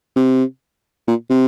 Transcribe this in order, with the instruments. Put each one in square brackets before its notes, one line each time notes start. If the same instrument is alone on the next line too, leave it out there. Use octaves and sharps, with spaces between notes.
[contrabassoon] C3
A#2
C3